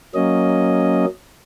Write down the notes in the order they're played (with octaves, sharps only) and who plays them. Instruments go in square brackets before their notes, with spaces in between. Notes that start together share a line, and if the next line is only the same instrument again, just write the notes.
[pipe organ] F#3 A#3 C#4 D#5